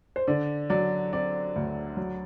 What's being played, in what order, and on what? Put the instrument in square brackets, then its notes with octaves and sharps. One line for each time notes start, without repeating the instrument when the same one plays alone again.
[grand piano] C5
[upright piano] D3 [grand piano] D5
[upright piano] F#3 [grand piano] D5
[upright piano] C4 [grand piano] D5
[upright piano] D2
F#3